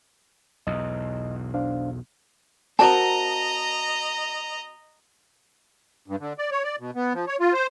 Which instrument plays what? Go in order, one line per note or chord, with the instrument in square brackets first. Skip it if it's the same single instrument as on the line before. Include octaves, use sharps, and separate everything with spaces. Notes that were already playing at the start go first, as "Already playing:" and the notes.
[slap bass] B1 E2 [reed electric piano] D#5
[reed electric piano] D4 C5 F5
[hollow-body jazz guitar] C4 F#4 A#4 [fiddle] D#5 A#5 [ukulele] A5
[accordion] G2
D3
D5
C#5
D5
B2
B3
F3
C#5
F4
C5